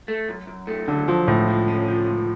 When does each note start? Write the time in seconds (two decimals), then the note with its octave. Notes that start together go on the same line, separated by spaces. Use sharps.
0.08 A3
0.28 F#2
0.47 F#2
0.67 A3
0.88 D3 F#3
1.08 F3 F#3
1.28 C#2 A2
1.48 F3
1.68 C#4
1.88 F3
2.07 C#2